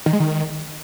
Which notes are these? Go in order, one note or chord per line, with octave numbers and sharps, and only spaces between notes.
D#3
G#3
D#3